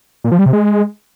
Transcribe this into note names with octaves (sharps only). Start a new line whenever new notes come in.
A#2
F3
G3
C3
G#3